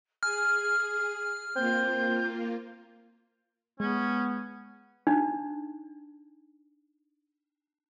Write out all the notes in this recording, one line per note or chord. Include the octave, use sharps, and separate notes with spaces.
G#4 G#5 F6
A#3 C4 F4 G6
G#3 B3 C#4
D4 D#4